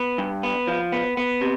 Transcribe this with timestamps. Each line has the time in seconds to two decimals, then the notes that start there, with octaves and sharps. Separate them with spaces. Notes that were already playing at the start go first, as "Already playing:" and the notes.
Already playing: B3
0.18 G2
0.43 B3
0.67 F3
0.92 B3
1.17 B3
1.41 C3